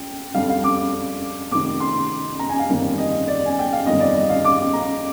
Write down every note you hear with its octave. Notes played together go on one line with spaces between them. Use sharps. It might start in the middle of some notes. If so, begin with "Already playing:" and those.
Already playing: G5
F2 D3 G3 F5
F5
D6
F1 F2 D#3 D6
C6
A#5
G#5
F5
G1 F2 D#3 G3 A#3
D#5
D5
G#5
G5
F5
G1 F2 D#3 G3 D#5
D5
D#5
F5
D6
A#5